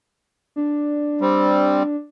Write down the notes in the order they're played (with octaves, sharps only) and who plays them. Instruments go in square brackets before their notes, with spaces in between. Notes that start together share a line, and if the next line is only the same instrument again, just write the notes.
[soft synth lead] D4
[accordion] G3 C4